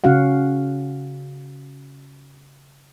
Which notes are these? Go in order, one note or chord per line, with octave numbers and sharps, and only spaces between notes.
C#3 C#4 F#4 F5 F#5